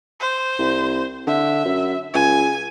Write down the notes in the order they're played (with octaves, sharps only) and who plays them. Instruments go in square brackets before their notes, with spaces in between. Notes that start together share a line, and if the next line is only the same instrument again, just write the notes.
[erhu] C5
[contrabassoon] C2
[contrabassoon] D3 [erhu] E5
[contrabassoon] F#2
[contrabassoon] C#2 [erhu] G#5